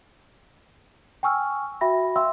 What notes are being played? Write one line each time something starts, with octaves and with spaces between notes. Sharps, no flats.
G5 G#5 C#6 E6 F6
F#4 E5 G5 B5 A#6
E5 F5 G5 C6 E6